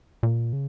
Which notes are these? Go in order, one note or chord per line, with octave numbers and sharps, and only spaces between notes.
A#2
C#3